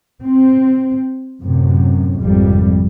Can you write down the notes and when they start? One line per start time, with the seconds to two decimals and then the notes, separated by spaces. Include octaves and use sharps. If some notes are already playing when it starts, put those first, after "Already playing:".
0.22 C4
1.42 F#2 A2 C3
2.21 G#1 F2 C3 G3